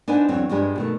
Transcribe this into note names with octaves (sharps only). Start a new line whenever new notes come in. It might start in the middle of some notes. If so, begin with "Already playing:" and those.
D4 D#4 B4 C5 F#5 G#5
E2 D3 F#3 C4 C#5
G2 F3 G#3 D4 G4 B4
B2 D#3 A3